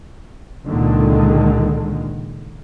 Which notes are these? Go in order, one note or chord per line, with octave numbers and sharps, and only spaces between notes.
C#2 A#2 D3 D#3 G#3